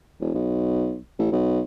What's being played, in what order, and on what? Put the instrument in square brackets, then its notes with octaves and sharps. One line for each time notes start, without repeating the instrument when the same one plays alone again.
[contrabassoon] E1
B1
A1
B1